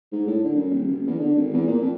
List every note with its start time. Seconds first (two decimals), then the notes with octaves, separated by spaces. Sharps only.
0.12 G#2
0.27 A2
0.44 D3
0.55 F#2
0.71 D#1
0.86 F#1
1.07 E2
1.19 D3
1.36 G#1
1.53 E2
1.67 A#2
1.81 F2